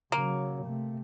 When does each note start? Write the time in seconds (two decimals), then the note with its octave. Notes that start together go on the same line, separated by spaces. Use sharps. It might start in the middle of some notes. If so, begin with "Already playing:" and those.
0.12 C#3 F#3 A#3
0.65 C3 A3